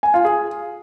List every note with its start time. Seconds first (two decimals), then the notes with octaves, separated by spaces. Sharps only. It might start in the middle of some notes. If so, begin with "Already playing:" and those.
0.03 G#5
0.14 F4
0.25 G#4